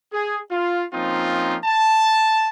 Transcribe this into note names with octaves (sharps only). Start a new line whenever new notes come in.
G#4
F4
F3 A#3 C4 C#4 D#4 F4
A5